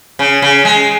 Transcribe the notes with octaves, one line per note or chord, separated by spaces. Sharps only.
C#3
C#3
G#3